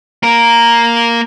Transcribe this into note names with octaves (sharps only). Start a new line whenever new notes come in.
A#3 A#4